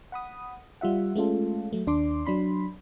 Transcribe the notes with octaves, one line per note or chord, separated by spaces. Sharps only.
F#5 B5 D#6
G3 F4 E5 F#5
G#3 A3 C#4 F4 A4
F#3 A3
D#2 D4 C6 D6
F#3 D4 B5 C6